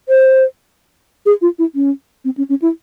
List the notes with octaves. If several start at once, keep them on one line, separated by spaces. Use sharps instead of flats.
C5
G#4
F4
E4
C#4
C4
C#4
C#4
E4